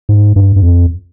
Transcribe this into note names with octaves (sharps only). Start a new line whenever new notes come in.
G#2
G2
G2
F2